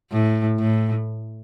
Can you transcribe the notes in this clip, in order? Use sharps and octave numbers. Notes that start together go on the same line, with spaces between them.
A2
A2